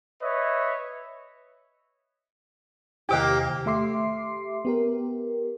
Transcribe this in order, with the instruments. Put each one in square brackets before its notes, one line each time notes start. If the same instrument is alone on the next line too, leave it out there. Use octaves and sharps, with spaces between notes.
[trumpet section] B4 C#5 D#5 E5
[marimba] E2 C3 D#3 [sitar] A#3 G4
[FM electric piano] A3 G4 E5 C6 D6 C7
B3 G4 A#4